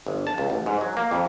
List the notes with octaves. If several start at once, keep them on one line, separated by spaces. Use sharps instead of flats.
G1
A5
C#2
A1
G#2
F#3
A#3
F2